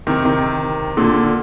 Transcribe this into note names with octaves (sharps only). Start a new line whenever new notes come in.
C3 D#3
C3 D#3
A#2 D3